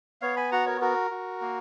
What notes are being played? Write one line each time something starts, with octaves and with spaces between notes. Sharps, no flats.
B3 C#5 F5
G#5 B5
F#4 F#5 A#5
A#4 C#5
F#4 A#4
F#4
A#3